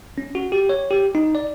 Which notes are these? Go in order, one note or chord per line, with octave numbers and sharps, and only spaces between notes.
C#4
F#4
G4
C#5
G4
D#4
D5